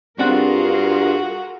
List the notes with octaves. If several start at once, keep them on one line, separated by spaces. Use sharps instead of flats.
G2 C4 D4 F4 F#4 G#4 A#4 F#5